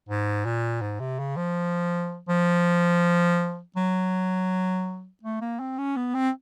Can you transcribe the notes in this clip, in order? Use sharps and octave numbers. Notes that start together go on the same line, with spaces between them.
G#2
A#2
G#2
C3
C#3
F3
F3
F#3
A3
A#3
C4
C#4
B3
C4